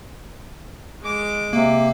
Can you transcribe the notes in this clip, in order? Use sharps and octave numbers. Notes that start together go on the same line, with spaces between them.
G#3 D6
C3 A#3